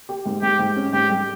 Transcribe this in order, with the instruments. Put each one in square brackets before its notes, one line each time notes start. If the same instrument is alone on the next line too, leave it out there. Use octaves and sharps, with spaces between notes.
[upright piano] G4
G#2
[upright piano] G#2 [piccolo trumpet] G4
[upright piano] G#2
C#4
[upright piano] G#2 [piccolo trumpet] G4
[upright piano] G3